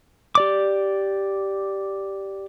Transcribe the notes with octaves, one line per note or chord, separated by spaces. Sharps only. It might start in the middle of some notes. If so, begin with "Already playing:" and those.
G4 D5 D6